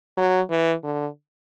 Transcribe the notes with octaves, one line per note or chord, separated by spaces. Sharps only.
F#3
E3
D3